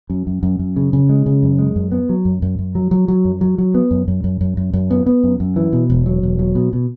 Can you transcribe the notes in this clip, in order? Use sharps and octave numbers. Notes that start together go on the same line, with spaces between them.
F#2
F#2
F#2
F#2
C#3
C#3
G#3
C#3
F#2
G#3
F#2
B3
F#3
F#2
F#2
F#2
F#3
F#3
F#3
F#2
F#3
F#3
B3
F#2
F#2
F#2
F#2
F#2
F#2
B3
B3
F#2
F#2
E3
B2
E1
F#3
E1
F#3
B2
B2